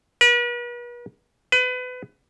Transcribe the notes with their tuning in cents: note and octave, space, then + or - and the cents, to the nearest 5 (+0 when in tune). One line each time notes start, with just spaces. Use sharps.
B4 -45
B4 +25